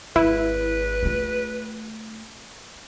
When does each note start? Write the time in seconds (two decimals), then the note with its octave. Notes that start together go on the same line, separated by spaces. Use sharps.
0.16 G#1 E4 B4
1.03 A3 F4